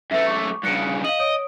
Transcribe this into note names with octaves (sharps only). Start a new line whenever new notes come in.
F#2 A3 B4 E5
C#6 D6
G2 C#3 F#6 C#7 D7
D#5 F5 F#7
C#5 D#6 D7